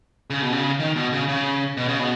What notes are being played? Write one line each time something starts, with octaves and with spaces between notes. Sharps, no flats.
C#3
B2
C#3
D#3
B2
C#3
C#3
B2
C#3
B2